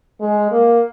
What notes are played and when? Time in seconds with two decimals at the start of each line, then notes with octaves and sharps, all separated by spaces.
0.21 G#3
0.51 A#3